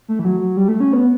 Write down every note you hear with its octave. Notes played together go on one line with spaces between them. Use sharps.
A3
E3
F#3
F#3
G3
A3
C#4
B3